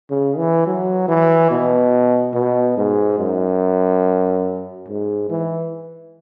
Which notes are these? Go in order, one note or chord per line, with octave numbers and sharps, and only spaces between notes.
C#3
E3
F#3
E3
B2
B2
G#2
F#2
G#2
E3